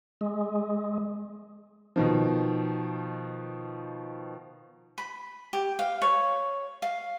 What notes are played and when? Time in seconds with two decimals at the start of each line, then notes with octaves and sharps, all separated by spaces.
0.21 G#3
1.96 B2 D#3 F3
4.98 B5
5.53 G4
5.79 F5
6.02 C#5
6.82 F5